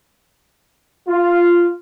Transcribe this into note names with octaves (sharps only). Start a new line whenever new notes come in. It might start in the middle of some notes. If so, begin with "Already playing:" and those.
F4